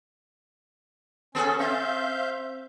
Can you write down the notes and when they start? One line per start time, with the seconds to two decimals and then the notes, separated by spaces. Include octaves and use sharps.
1.35 B3 C#4 G#4 A4
1.59 C4 E5 F5 G6